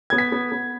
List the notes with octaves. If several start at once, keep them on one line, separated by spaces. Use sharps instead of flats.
B3 G#6
B6
B3
B3